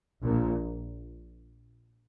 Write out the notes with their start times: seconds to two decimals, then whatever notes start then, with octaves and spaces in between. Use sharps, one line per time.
0.22 A#1 A#2